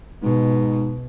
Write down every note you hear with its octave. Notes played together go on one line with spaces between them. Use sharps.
G#2 B2